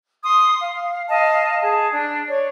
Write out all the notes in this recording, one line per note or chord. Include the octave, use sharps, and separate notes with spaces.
C6 D#6
F5
D#5 F5 A5
G#4 A5
D4
C#5 D5